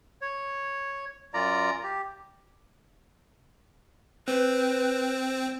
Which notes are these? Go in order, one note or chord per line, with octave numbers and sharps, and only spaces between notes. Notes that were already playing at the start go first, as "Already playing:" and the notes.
C#5
F#2 F4 D5 A#5
G4
C4 B4